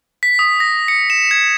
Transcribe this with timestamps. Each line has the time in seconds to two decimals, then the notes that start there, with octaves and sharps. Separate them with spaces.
0.23 B6
0.39 D#6
0.60 A#6
0.88 C#7
1.10 E7
1.31 G#6